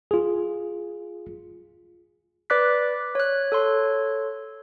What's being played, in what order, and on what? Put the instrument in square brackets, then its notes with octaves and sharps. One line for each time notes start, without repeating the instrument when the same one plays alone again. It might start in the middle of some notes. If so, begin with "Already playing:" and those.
[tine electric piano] F4 G#4
[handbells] B4 D5 D6 F#6 B6
C#5 F#6
A4 C#5 C6